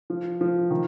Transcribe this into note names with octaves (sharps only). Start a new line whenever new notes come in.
F3
F3
D#3